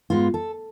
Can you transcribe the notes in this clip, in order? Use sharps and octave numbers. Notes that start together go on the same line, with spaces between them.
G#2 G#3 B3 F4
A4